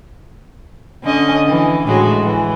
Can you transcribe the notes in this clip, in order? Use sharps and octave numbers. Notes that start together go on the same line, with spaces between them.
D3 C#4 D#5
E3
A2 G#3 F#4
E3